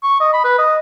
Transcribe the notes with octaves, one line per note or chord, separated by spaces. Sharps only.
C#6
D#5
B5
B4
D#5